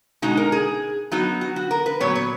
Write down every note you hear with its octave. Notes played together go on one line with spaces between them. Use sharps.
B2 G#3 D#4 F#4
A#4
G#4
F#3 B3 D#4 F#4
F#4
F#4
A#4
B4
A#2 F#3 B3 C#5
C#5